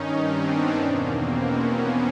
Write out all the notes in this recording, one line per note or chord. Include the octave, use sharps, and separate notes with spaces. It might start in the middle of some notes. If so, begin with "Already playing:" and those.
Already playing: G2 D#3 C#4 D#4
C4 D4
B3
E2 B2 A#3
A#3 C4
B3 C#4
B3